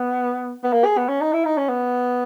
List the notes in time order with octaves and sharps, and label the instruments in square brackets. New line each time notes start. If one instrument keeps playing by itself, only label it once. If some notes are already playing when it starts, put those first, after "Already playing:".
Already playing: [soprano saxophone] B3
B3
A#3
G#4
B3
C#4
D#4
E4
D#4
C#4
B3